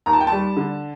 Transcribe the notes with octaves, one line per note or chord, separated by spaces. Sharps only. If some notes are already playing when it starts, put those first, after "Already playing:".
D#2 A#5
A5
G5
A5
G3
D3